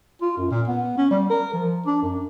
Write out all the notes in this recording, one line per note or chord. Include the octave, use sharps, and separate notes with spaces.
F4
F#2
A#2
B3
C#4
G3
A#4
F3
D4
F#2